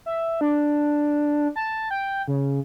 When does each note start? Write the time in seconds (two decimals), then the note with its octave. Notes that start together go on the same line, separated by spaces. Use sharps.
0.06 E5
0.41 D4
1.56 A5
1.91 G5
2.28 C#3